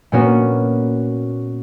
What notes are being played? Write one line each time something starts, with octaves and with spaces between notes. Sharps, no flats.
A#2 A#3 B3 C#4 F#4